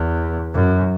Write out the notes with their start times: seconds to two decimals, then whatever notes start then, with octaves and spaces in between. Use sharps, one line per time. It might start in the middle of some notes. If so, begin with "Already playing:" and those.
Already playing: E2
0.54 F#2